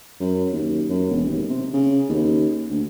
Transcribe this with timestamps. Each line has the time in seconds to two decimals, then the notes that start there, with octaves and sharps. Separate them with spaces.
0.21 F#2
0.53 D#2
0.89 F#2
1.11 E1
1.28 D#2
1.50 C3
1.74 C#3
2.09 D#2
2.70 D2